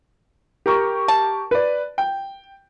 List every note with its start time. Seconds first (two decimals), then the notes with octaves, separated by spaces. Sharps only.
0.66 G4 A#4 C#6
1.08 A5
1.51 B4 D5
1.98 G5